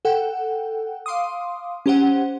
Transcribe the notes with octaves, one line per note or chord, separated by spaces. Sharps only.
A4 F#5 G5
F5 C6 D6 D#6
C#4 G4 C5 F#5